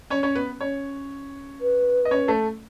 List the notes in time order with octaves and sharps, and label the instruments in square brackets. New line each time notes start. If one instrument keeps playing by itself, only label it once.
[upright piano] C#4 C#5
C#4 C#5
B3 B4
C#4 C#5
[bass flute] B4
[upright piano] D#5
C#4 C#5
A3 A4